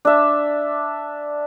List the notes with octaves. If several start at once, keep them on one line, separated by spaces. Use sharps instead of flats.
D4 E5